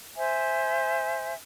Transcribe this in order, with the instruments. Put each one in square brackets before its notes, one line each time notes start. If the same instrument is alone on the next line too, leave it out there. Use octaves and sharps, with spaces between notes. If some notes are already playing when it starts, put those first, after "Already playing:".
[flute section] C5 E5 G#5